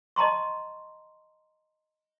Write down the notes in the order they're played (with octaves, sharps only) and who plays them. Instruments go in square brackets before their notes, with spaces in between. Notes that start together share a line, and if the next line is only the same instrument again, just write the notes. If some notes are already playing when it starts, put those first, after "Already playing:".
[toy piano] D#5 A5 A#5 C6 C#6